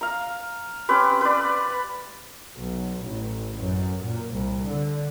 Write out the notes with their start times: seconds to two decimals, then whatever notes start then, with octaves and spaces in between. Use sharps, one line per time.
0.01 F5 A#5
0.89 C4 C#4 G4 B4
1.21 B4 D5
2.57 B1
3.03 A1
3.58 F#2
4.03 A#2
4.35 C2
4.69 D3